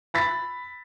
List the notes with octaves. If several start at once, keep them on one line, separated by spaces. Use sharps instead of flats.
B5 A6 B6